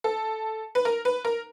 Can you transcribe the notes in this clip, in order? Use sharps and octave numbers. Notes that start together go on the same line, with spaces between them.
A4
B4
A#4
B4
A#4